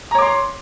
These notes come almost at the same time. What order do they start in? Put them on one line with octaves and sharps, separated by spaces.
A#5 C#5 D6 C6